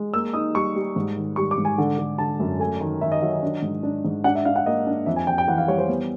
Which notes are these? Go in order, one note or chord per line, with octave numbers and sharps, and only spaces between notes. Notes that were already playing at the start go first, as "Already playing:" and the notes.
Already playing: G#3
A#3 E6
D#4 D#6
G3 C#6
G3
G#2
D#3
G3 C#6
D6
G#2
G#5
D3
D3
D3 A5
F#2
A3 G#5
D#3
D#3 E5
D#5
F#3 E5
D#5
D4
G#2
D4
G#2
D4 F#5
E5
D4 F5
F#5
A#3 D#5
D4
F2 E5
G#5
F2 G5
G5
E3 F#5
F5
G3 C#5
C5
B3